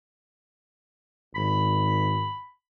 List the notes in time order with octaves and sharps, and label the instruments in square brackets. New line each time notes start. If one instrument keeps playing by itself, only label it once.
[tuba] G#1 [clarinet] B5